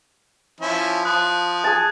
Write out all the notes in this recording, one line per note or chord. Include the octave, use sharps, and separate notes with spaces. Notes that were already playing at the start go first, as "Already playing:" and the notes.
F3 C#4 E4
F3 D#6 F#6
G#4 A5